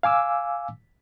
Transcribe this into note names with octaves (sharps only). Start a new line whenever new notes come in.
F5 G#5 D6 E6